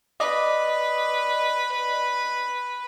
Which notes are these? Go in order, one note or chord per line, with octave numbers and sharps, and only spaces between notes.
B4 D5 D#5